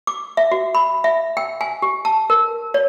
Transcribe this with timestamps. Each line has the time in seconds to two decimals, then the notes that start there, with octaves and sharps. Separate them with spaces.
0.07 D6
0.37 E5
0.51 F#4
0.75 B5
1.04 E5
1.37 G5
1.61 G#5
1.82 G4
2.05 A5
2.30 A#4
2.74 C#5